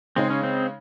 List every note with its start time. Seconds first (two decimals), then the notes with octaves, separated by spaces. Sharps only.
0.16 C#3 G#3 C4 D#4 G#4
0.30 C#4
0.43 C4